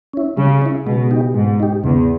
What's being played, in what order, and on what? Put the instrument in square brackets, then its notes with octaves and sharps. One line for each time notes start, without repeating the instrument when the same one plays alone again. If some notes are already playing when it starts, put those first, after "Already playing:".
[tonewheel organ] C#4 E4
[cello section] C#3 [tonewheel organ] G3
[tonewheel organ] C#4 E4
[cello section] B2 [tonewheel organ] G#3
[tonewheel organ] D#4 G4
[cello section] G#2 [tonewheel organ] G#3
[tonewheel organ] D#4 G4
[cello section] E2 [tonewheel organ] C#3